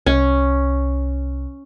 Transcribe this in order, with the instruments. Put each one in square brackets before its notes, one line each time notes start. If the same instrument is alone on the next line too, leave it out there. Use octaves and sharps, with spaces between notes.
[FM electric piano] C2 [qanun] C#4